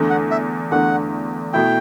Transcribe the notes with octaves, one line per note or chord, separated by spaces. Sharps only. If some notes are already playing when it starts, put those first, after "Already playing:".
Already playing: E2 D3 A3
F#5
E5
E2 D3 A3 F#5
B2 A3 E4 G5